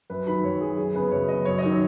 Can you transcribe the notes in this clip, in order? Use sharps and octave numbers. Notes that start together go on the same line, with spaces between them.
F#2 B4
D#3 F#3 B5
F#2 C#5
D#3 F#3 G#4
F#2 G#4
C#3 B3 B4
F#2 C#5
C#3 B3 D#5
F#2 C#5
D#5
D#3 F#3 C#5